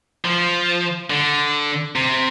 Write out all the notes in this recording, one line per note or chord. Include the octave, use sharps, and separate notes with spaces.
F3
D3
C3